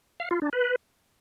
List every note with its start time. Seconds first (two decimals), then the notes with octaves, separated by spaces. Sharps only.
0.20 F5
0.31 F4
0.42 D4
0.53 B4